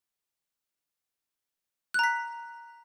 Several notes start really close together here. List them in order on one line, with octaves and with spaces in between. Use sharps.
F#6 A#5 B6